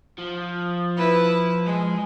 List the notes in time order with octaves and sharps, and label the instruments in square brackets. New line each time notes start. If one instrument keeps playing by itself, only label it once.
[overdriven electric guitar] F3
[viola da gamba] E4 B4
G#3